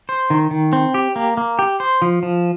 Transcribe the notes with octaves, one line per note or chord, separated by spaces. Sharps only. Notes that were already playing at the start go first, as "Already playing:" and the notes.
C5
D#3
D#3
C4
G4
A#3
A#3
G4
C5
F3
F3